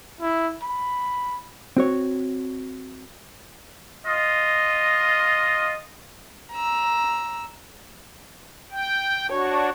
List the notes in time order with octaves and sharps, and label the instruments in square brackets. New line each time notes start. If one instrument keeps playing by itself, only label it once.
[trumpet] E4
B5
[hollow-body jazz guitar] C4 F#4 C#5
[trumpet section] F4 D#5
[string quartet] A#5 E6
[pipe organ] G5
[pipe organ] D4 F#4 [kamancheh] C#5